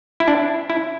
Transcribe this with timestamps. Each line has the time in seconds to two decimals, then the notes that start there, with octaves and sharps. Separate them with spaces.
0.20 E4
0.28 D4
0.70 E4